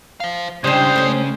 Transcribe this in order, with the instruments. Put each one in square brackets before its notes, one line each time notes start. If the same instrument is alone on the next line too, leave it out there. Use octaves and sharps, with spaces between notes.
[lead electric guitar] C5 F5
[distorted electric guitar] C#3 [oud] G3 D4 [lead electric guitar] G#3 E4 [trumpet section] C5
[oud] A3 C#4